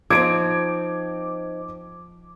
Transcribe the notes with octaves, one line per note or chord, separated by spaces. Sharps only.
F3 C4 D#4 D6 G#6 D7